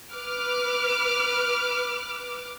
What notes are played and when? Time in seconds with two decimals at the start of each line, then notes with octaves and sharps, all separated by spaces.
0.13 B4 D6 F6